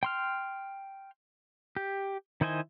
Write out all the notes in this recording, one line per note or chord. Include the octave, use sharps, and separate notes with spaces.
G5 C6 F6
G4
D#3 E4 C5 D#5 G#5